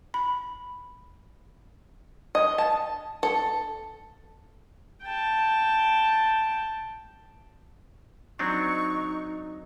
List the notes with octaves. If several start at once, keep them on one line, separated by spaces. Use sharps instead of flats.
B5
D#5
A5
A4
G5 A5
F#3 C4 D4 D#4 C#6